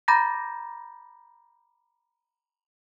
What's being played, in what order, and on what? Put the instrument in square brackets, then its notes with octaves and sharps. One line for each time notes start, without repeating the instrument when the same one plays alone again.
[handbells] A#5 B5 D6 G6 A6 A#6